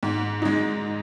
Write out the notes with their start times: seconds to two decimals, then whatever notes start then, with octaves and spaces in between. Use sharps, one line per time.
0.03 G#2
0.42 G#3 D#4